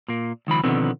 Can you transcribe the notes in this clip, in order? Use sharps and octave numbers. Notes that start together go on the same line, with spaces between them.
A#2 A#3
C#2 D#3 F3 B5
B2 D3 D#3 F3 B3 C4